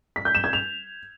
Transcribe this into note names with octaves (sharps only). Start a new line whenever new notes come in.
B6
G6
E7
G#6
F7